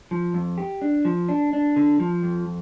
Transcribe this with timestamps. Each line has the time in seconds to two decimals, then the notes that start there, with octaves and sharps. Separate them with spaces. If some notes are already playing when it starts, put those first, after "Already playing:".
0.11 F3
0.34 F2
0.58 G4
0.82 D4
1.05 F3
1.29 D4
1.53 D4
1.76 D3
2.00 F3
2.23 F2